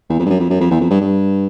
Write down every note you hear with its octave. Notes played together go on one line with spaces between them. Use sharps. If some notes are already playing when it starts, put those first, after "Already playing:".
E2
F2
G2
F#2
F2
F#2
F2
E2
F2
G2
G2